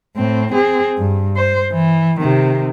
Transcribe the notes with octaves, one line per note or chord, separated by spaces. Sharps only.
A2 C4
C4 G#4
G2
C5
E3
C3 D#3